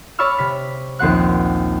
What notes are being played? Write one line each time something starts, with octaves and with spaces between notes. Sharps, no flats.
C#5 D5 B5 C#6 E6 F6
C3 B6
A#1 D#2 C4 F#5 F#6